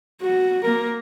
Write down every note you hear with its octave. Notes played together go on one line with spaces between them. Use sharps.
F#4
A#3 A#4